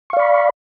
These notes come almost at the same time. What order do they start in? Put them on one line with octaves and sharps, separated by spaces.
C#6 F5 D5 B5